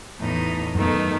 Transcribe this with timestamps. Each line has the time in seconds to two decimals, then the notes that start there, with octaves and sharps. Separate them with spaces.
0.19 E2 A2 D#4
0.75 F#2 B2 D#3 A3